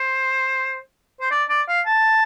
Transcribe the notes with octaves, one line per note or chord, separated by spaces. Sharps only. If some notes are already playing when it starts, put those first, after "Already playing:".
Already playing: C5
C5
D5
D5
F5
A5